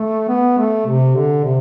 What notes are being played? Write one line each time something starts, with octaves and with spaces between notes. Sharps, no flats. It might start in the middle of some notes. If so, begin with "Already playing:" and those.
Already playing: A3
B3
A3
C3
D3
C3